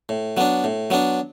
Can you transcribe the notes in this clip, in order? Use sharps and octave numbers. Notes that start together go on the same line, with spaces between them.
A2
F#3 B3 D4
A2
F#3 B3 D4